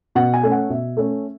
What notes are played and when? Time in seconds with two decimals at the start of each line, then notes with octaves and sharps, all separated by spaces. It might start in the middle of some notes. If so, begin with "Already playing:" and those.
0.15 B2 F#5
0.34 G#5
0.43 A3 C#4
0.51 F#5
0.70 B2 E5
0.97 A3 C#4